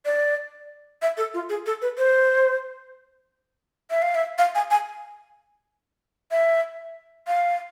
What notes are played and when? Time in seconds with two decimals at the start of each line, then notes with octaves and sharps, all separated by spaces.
0.06 D5
1.02 E5
1.17 A4
1.34 F4
1.49 G#4
1.66 A4
1.82 B4
1.98 C5
3.91 E5
4.02 F5
4.15 E5
4.38 F5
4.55 G#5
4.71 G#5
6.31 E5
7.27 F5